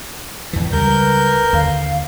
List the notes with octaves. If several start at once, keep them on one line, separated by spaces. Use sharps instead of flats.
E2 E3
C#2 G3 A#4 G6
B4
D#2 D3 F5